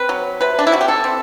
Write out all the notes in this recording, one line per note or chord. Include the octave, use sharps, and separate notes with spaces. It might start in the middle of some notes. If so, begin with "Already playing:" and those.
Already playing: C4 B4
F#3
C3 B4
D4
E4
C3 F#4
G4
A4
C4